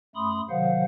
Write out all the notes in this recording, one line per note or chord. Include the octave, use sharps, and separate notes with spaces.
F#2 A3 B5 C6 D#6
C3 D#3 F#3 C5 F5 F#5